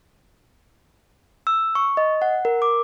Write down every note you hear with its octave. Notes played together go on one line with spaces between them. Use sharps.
E6
C#6
D#5
F#5
A#4
D6